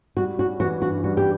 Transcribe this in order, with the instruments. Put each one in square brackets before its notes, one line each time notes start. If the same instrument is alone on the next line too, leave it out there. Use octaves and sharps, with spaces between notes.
[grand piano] G3 [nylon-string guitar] F#4
[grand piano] C#4 [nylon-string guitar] F#4
[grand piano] E3 [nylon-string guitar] F#4
[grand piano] G2 [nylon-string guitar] F#4
[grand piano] G3 [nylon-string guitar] F#4
[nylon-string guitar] G4